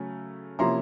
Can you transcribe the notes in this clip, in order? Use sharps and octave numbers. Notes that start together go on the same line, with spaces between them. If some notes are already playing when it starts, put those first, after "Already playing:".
Already playing: C#3 F#3 A3 C#4
C3 F3 A#3 C#4 E4 A#5 C6